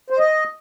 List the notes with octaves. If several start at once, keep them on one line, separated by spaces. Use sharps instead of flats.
C5
D#5